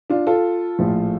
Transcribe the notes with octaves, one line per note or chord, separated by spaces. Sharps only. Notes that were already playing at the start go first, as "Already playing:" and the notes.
D4 F4
F4 A4
A#1 A2 F3